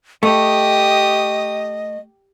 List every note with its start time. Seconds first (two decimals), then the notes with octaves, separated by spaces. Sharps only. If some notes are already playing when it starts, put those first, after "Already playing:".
0.23 A3 G4 D#5 D#6